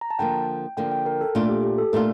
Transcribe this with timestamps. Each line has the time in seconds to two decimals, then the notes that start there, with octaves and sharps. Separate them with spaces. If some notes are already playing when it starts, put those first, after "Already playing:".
0.01 A#5
0.10 A5
0.19 D3 F3 A#3 G5
0.77 D3 F3 A#3 G5
0.91 G5
1.06 A#4
1.21 A4
1.35 A#2 A3 D4 F4
1.49 G4
1.63 G4
1.78 A4
1.93 A#2 A3 D4 F4 A#4